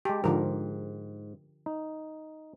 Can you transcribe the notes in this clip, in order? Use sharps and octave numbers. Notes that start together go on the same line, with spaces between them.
G#3 G4 A5
G#2 D3 F3 A#4
D#4